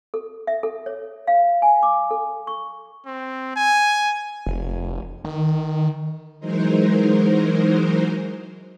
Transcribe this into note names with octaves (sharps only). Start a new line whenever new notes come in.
A4
E5
A4
C#5
F5
G#5
D6
A4
C#6
C4
G#5
F1
D#3
E3 F#3 G#3 D#4 A#4 C5